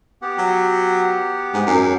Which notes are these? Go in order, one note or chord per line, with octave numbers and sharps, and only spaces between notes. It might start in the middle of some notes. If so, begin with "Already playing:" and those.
B3 G4 F#5
F#3
G#2
F#2